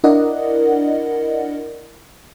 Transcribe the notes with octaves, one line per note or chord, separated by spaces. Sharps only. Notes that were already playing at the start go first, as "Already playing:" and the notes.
D4 E4 A#4 D5 D#5 F#5